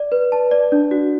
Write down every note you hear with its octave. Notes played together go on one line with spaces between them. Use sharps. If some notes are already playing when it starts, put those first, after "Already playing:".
Already playing: D5
B4
A5
D5
D4
F#4